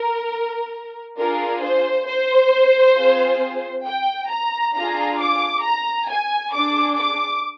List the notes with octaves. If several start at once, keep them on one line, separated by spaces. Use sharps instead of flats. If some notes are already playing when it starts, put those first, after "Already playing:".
Already playing: A#4
D4 F4 G#4 A#4
C5
C5
C4 F4 G#4
G5
A#5
D4 F4 G#4 A#5
D6
A#5
G#5
D4 G#4 D6
D6